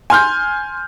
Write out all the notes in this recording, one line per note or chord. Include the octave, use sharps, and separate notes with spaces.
G#5 C6 F6 G6